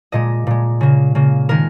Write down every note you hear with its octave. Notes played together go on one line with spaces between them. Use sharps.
A#2 G#3 D#5
A#2 G#3
C#3 A#3
C#3 A#3
D#3 G#3 A#4